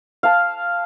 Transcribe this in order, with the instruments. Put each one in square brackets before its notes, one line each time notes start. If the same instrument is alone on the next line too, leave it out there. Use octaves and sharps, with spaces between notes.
[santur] F5 A5